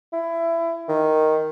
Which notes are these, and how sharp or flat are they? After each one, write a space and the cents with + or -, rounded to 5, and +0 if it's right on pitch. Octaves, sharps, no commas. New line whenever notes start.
E4 +20
D#3 +0